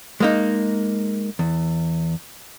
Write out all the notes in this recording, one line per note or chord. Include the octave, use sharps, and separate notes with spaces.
G#3 A#3 D#4
E2